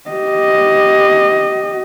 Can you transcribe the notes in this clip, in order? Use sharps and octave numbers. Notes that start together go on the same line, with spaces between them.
G4 D#5